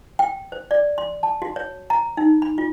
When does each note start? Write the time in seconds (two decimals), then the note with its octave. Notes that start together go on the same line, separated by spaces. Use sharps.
0.19 G5
0.52 C5
0.71 D5
0.98 C6
1.23 A5
1.42 F#4
1.56 C#5
1.90 A#5
2.17 D#4
2.42 B5
2.58 F4